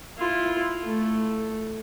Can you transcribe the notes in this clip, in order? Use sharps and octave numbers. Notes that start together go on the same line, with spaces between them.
E4 F4
A3